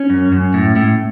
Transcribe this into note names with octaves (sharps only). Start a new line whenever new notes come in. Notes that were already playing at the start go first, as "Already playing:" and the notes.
Already playing: C#4
F#2
F#2
A2
A2